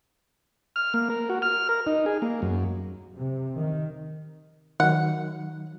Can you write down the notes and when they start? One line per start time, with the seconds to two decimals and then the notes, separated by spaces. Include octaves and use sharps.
0.76 F6
0.94 A#3
1.10 A#4
1.30 F#4
1.42 F6
1.69 A#4
1.87 D#4
2.06 G#4
2.22 A#3
2.42 F#2
3.16 C3
3.57 D#3
4.80 D#3 F#3 F#5